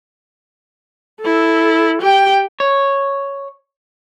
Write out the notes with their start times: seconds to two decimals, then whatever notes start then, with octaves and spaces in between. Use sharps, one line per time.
1.21 E4 A4
2.02 G4 G5
2.60 C#5